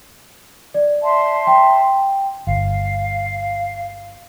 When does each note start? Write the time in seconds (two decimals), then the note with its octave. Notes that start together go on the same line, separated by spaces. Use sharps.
0.74 D5
1.02 E5 A5 C6
1.47 G5
2.47 G1 F5